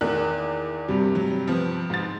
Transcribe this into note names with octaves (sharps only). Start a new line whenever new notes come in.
E2 D#3 A#3 F#6
G2 C3 G3
F#3
F3 B3
G#2 A6